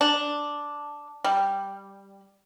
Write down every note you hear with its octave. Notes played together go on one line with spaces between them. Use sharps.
D4
G3